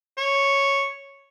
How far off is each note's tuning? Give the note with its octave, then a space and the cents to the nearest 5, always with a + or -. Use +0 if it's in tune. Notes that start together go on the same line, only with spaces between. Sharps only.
C#5 -5